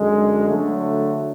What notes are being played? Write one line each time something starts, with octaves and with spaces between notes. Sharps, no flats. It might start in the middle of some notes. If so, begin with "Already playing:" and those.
Already playing: F#2 D3 G#3
D3 F#3 A3